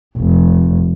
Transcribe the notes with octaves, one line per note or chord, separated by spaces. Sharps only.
F1